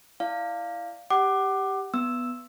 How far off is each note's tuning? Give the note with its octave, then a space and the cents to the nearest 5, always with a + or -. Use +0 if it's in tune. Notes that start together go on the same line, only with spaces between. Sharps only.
E4 +0 D5 +0 F5 +0
G4 +0 F#5 +35 D6 +15
B3 +0 E6 +0